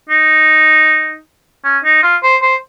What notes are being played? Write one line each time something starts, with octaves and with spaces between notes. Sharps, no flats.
D#4
C#4
D#4
F4
C5
C5